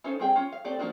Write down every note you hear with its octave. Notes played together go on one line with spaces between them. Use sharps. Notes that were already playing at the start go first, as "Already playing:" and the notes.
C#4 D#4 A4 C5
G3 C4 G#4 G5
C#4 F4
F5
A3 C4 G4 D5
F3 G#3 A#3 D4 F#4